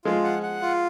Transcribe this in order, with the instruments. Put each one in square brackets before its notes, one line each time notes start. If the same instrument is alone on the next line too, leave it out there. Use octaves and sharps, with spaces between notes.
[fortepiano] F3 G#3 [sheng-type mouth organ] F4
[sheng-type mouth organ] F#5
F#5
F4